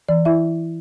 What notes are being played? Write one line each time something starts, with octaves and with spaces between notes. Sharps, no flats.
E3 D5
E4 E5